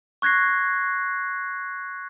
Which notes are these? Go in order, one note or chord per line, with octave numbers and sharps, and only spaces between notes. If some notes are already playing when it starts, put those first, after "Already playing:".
C#6 F#6 G#6 A#6 C7